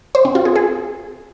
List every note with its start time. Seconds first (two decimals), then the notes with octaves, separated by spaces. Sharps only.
0.15 C5
0.25 C4
0.35 F4
0.45 G#4
0.56 G#4